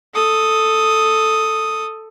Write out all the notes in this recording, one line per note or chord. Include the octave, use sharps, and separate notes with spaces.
A4 D#6